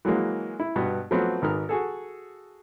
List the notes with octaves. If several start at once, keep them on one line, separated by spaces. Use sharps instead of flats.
E3 F#3 G#3 A#3
E4
G2 B2 B3
F3 F#3 A3 B3 C4
G#1 D#3 A#4 B4 F6
F#4 G#4 A4